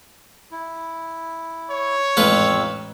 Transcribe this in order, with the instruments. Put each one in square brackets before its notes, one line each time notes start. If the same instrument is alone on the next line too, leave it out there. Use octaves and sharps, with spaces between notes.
[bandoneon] E4
[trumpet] C#5
[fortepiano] A1 G#2 [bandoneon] F2 E6 [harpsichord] F4 B4